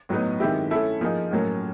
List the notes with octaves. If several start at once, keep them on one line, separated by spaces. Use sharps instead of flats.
A2 F#3 B3 D#4
D#3 G#3 C4 E4 G4
A3 C#4 E4 A4
F3 A#3 D#4 G#4
A2 F#3 A#3 C#4